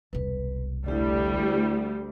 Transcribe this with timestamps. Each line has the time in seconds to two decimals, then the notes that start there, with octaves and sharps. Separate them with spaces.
0.13 E1 C2 B4
0.86 D2 G3 E4 G4 D5